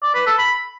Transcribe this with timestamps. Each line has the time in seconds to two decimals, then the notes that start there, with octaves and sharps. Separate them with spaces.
0.03 D5
0.15 B4
0.27 A4
0.39 B5